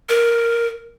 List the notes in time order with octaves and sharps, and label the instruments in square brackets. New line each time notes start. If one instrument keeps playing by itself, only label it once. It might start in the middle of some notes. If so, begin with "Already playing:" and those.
[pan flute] A#4